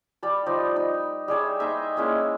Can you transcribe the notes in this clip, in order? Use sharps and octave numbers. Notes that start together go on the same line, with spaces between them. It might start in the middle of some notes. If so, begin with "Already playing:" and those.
G3 D5 B5
F3 G3 D#4
D#4
G3 G#4 C#5 E5
D#4 C5 D#5 E5
G#3 A#3 C#4 E4